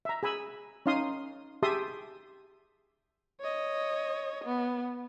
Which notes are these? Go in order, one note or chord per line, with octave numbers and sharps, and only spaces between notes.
E5 A#5
G#4 G#5 B5 E6
C#4 D#4 F5 C6 D#6
G4 G#4 E5 A5 C6 D#6
C#5 D#5
B3